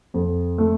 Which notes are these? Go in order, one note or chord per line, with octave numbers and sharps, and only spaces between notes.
F2
A3